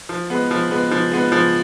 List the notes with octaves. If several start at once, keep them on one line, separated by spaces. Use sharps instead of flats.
F3
G#3 B3
F3
G#3 B3
F3
G#3 B3
F3